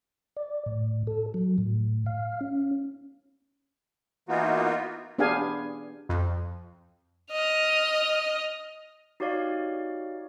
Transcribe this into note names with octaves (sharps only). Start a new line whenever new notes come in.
D5
A2
A4
F#3
A2
F5
C#4
E3 A#3 B3 D#4 F4 F#4
B3 D4 G4 G#4 F5 G#5
F2
D#5 F6
D#4 F#4 G4 C#5 D5 F5